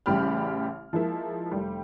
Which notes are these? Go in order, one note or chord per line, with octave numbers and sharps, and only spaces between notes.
A1 C#3 G3 G4 B5 F6
F3 G#3 A#3 E4
F1 G3